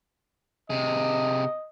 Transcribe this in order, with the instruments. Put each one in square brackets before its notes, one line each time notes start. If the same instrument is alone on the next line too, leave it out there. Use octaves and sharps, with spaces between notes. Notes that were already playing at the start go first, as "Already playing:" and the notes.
[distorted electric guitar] C3 G#4 [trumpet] D#5